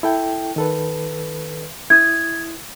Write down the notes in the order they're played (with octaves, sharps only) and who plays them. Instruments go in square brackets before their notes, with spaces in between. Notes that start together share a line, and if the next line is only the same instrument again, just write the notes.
[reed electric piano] E4 A4 G5
D#3 A4 B4
[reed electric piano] E4 D#6 [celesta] G#6